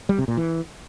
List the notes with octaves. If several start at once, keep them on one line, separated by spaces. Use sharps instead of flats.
G3
C3
A#2
E3